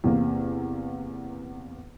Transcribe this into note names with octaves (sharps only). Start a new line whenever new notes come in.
E2 C3 A#3